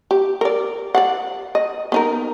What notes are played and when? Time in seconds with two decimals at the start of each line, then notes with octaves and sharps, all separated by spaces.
0.11 G4
0.41 A#4 D5
0.95 D5 F5 F#5
1.55 D#5
1.92 B3 D#4 A#4